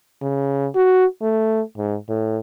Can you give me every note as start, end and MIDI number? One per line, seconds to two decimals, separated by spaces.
0.22 0.68 49
0.75 1.05 66
1.21 1.61 57
1.78 1.96 44
2.09 2.39 45